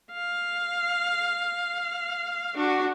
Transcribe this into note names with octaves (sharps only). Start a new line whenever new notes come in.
F5
D4 F#4